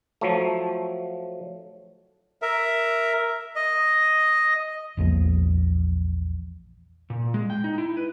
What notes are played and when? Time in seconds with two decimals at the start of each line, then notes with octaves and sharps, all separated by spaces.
0.21 F3 F#3 A3
2.42 A#4 E5
3.56 D#5
4.97 A#1 E2 F3 A#3
7.10 A#2
7.34 G#3
7.50 G5
7.64 D#4
7.78 E4
7.97 B4